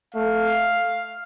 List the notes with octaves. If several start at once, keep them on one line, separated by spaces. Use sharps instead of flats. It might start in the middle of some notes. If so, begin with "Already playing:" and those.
A3 F5